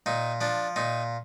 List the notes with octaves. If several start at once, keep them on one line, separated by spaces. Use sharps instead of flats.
A#2 D#4
F3 D4
A#2 D#4